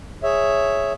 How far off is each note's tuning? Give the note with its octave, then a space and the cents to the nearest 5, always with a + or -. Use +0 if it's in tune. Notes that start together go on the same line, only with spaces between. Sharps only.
G#4 +0 C#5 +0 E5 +0